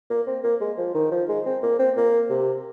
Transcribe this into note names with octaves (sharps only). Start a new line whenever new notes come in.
A#3
C4
A#3
G#3
F3
D#3
F3
G#3
C4
A#3
C4
A#3
C3